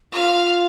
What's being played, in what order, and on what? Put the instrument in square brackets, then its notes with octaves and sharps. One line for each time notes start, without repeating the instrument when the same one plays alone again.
[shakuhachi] F4 [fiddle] F5